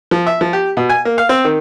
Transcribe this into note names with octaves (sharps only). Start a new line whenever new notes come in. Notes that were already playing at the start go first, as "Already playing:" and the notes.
F3
E5
F3
G4
B2
G#5
A#3
F5
C4
D#3